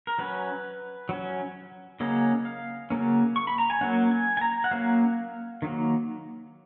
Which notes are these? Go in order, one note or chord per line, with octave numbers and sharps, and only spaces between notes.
A#4
F#3 C#4 B4
F#3 C#4
C#3 F#3 A#3 C#4 D#5
F5
C#3 F#3 A#3 C#4
C#6
B5
A#5
G#5
F#3 A#3 C#4 F#5
G#5
G#5
A#5
F#5
F#3 A#3 C#4 F5
D#3 F#3 A#3